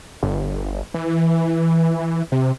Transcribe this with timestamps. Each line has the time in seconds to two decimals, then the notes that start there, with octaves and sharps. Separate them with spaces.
0.23 G1
0.94 E3
2.32 C3